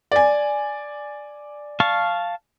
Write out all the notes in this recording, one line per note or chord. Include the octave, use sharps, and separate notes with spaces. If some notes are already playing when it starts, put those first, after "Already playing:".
D5 G#5
F5 A5 C#6